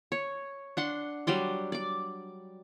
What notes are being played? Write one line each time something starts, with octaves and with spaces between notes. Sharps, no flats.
C#5
D4 F#5 C6
F#3 G3 D5 C6
D5 D6